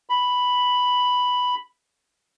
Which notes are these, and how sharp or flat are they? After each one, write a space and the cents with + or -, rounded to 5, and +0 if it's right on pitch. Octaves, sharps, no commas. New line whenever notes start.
B5 +0